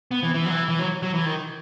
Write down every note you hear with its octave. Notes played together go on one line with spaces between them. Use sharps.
B3
E3
E3
F#3
E3
E3
F#3
F#3
E3
D#3